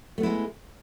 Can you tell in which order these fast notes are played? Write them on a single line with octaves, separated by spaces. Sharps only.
A3 B3 E4 G#3